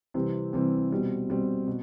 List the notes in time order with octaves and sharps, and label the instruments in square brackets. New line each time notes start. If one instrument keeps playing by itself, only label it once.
[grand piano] C3 E3 G3 C4
C3 E3 G3 C4
B2 G3 C4
B2 G3 C4
B2